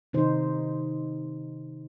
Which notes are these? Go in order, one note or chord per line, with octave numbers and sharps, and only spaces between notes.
C3 D#3 D#4 C5